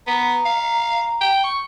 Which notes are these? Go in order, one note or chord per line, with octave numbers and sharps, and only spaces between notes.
B3 A#5
F5
G5
C#6